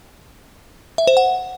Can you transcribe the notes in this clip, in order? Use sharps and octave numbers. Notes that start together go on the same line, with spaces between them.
E5
C5
F#5